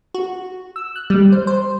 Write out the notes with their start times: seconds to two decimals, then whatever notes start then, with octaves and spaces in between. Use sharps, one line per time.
0.14 F#4
0.76 E6
0.96 F#6
1.10 G3
1.32 C5
1.47 C5